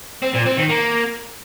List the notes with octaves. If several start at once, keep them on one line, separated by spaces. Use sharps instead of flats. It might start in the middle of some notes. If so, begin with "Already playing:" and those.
C4
A#2
C4
D#3
A#3